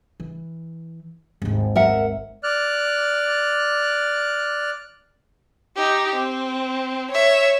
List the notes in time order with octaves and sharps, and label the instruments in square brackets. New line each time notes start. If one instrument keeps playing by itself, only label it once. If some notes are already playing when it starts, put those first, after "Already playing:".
[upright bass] E3
G#1 D#2
[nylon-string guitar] A#4 E5 F#5
[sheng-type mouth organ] D5 F6 F#6
[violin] D#4 G4
C4
C#5 E5